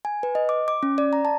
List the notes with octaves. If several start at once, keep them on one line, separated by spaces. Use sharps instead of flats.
G#5
B4
D#5
D6
D6
C#4
D5
A#5
A5